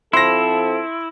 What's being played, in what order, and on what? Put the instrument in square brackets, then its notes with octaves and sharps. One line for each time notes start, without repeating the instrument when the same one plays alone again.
[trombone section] F3 C4 A4 [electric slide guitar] E4 [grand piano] C6 A#6